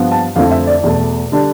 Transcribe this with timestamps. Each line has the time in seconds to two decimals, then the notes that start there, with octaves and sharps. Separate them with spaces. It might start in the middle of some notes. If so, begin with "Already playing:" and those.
Already playing: G2 F3 B3
0.12 A5
0.36 F2 D3 A3 C4 E4 F5
0.51 E5
0.67 D5
0.84 E2 B2 A3
1.32 D3 G3 D4